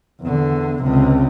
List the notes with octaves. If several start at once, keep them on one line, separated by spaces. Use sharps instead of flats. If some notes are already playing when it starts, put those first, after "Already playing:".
E2 D3
C#2 C3